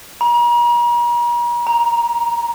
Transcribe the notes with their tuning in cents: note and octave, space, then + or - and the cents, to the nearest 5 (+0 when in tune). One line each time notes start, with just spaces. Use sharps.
A#5 +40
A#5 +10